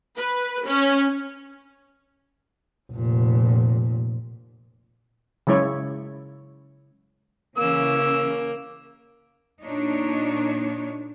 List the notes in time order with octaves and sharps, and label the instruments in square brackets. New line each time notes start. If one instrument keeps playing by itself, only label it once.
[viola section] B4
C#4
[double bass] F1 A#2
[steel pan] C#3 F#3 G#3 E4 C#5
[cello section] C#3 E3 C#4 [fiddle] A#3 [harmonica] E6
[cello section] A#2 D4 D#4 C#5